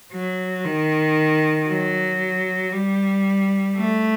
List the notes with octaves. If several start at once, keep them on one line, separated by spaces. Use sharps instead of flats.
F#3
D#3
F#3
G3
A3